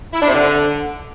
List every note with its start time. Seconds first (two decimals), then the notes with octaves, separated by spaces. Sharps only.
0.13 E4
0.21 D4
0.28 C3
0.35 D3